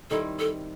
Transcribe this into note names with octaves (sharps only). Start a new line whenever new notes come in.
D#3 G3 C4 E4 A4
A4